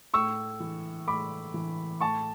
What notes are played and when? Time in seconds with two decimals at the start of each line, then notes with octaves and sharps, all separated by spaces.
0.14 A2 C#6 E6
0.60 E3
1.07 A2 B5 D6
1.54 E3
2.01 A2 A5 C#6